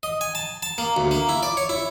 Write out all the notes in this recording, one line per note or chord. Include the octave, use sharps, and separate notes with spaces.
D#5
G#5
A5
A5
A#3
D2
A#3
E4
D5
C#5
E4